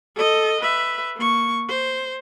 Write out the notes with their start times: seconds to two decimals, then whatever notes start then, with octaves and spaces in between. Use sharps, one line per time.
0.15 A4 D#5
0.61 B4 E5
1.16 A#3 C#6
1.69 C5